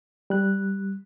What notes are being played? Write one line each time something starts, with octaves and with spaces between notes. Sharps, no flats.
G3 F#6